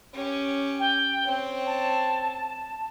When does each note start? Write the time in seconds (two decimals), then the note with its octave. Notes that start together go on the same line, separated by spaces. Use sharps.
0.14 C#4 G4
0.80 G5
1.23 C4 C#5
1.66 A5